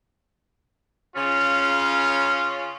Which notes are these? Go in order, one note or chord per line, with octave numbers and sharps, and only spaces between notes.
C#3 C#4 F4